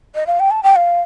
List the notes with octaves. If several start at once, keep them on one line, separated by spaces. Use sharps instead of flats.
D#5
F5
G5
A5
G5
F5